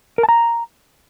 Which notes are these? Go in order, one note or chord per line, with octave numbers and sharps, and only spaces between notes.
A#4
A5
A#5